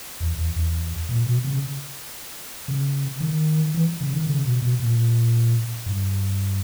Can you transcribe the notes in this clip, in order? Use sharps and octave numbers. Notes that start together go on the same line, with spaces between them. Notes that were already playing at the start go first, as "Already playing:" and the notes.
E2
E2
E2
A#2
B2
C#3
C#3
D#3
E3
C#3
D#3
C#3
B2
B2
A#2
G2